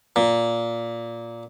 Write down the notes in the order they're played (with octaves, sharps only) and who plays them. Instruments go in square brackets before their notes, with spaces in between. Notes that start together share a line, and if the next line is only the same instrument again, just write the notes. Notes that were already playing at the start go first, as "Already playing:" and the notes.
[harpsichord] A#2